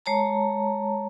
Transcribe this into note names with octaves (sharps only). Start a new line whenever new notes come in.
G#3 C#5 A5 A#5